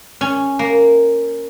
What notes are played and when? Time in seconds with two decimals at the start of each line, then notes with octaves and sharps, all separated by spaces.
0.21 C#4
0.59 A#3